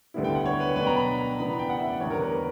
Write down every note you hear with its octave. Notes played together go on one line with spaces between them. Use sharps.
D2 D3 G3 B3 E4
G5
F#5
C#5
B4
B2 F#3 B3 D4 B4
G5
A#5
B5
C#3 E3 B3 D4 B5
G5
F#5
E5
D5
E2 D3 G3 B3 C#5
A#4
B4
A#4